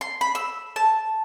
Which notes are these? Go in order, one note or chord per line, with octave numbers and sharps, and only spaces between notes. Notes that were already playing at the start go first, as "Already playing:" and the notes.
C6
B5
E6
A5